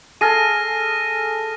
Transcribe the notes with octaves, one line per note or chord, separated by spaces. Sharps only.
G#4 A4 F6 A#6 D#7